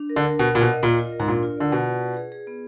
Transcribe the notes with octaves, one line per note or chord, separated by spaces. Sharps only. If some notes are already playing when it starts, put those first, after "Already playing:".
Already playing: D4
A#4
D3
A#4
B2 A#4
A#2 F#5
B2
D#5
A#2 F4
F4
A#4
G#2
A#2 D4
F4
D3 D5
B2 F4
B4
B4
G#4
G#4
B3